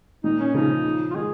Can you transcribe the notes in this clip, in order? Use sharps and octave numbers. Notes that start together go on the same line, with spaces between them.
A#2 D#3 D#4
C#4
C#3 F3 D#4
F4
D#3 G#3 G#4